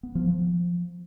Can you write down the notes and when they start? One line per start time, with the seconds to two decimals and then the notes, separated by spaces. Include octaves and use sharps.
0.03 B3
0.15 F3
0.27 F3